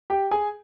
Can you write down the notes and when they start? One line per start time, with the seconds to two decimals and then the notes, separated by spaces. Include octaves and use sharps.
0.10 G4 G5
0.31 G#4 G#5